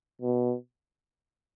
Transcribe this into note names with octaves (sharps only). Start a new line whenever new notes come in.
B2